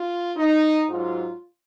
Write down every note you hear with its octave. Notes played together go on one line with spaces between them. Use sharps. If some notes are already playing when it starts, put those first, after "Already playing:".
Already playing: F4
D#4
G#2 F#3 F4